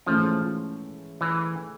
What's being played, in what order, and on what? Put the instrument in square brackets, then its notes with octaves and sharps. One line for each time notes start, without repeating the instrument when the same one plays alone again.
[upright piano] G#2 E3 A3 C#4 [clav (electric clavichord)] F3
[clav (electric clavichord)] E3